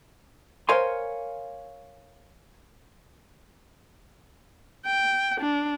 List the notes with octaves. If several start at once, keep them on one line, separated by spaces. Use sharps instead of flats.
A#4 C5 C#5 F5 G#5 C6
G5
D4